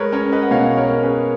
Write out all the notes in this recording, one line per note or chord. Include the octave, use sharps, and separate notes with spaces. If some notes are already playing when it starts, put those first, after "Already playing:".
Already playing: G#3 A#4 B4 C#5
C#4 A#4 C#5
B4 D#5
F#5
B2 C#5 F5
A#4 C#5
C#4
G#4 B4